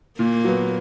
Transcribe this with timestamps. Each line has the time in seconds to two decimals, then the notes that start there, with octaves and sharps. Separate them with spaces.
0.18 A#2 A#3
0.44 F#3 B3